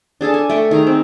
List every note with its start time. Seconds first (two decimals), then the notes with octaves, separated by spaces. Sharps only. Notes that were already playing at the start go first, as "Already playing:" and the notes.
0.21 D4 G#4 A4 A5
0.34 G#5
0.50 A3 G5 C#6
0.71 D#3 G#4 A#5
0.87 C4